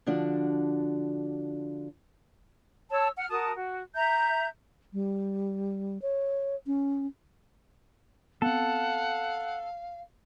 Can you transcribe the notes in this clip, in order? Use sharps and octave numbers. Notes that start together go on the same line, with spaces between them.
D3 F3 D4 F#4
C#5 A5 E6
F#5 F6
F#4 A#4 A5 D#6
F#4
E5 A#5 G6
G3
C#5
C#4
B3 C4 A4 F5 F#5